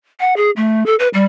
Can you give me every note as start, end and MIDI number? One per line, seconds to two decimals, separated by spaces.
0.20 0.34 78
0.37 0.51 68
0.56 0.84 57
0.86 0.95 69
0.99 1.08 71
1.14 1.25 55